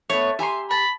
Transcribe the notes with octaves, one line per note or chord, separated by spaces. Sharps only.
A3 B3 C#5
G4 E5 G#5 A#5 C6
A5 B5